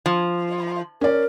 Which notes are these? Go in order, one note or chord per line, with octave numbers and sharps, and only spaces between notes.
F3
C#4 A#4 D5